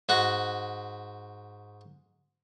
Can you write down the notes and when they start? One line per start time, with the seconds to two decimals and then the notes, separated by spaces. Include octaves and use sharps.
0.09 G#2 F#4